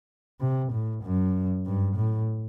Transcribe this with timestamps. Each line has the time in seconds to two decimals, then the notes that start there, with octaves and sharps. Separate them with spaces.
0.40 C3
0.72 A2
1.03 F#2
1.66 G2
1.96 A2